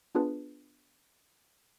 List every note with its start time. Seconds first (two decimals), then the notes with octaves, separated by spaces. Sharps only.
0.15 B3 D4 F4 G#4 B4 A5